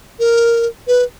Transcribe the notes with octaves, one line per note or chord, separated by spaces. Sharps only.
A#4
B4